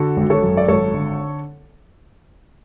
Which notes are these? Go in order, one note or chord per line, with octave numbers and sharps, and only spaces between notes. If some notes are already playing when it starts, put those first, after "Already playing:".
Already playing: D3 F#4 A4
G#1
A4 C#5
F#2
D5
G#1 A4 C#5
D3